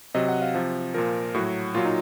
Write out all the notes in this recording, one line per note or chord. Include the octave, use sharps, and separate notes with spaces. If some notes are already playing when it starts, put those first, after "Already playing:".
C3 F#3 D#5
F#5
F5
C3 F3
A#2 F3 A#4
A2 F#3 F#4
A#2 F#3 F4
D#4